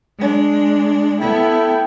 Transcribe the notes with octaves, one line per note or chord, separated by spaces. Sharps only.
G#3 D4
B3 E4 A4 G5